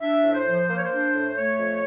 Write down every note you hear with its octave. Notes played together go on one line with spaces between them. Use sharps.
D4 E5
A2
C5
F3
A#3 C5
C#5
C5
D4
A2
A3 C#5
F2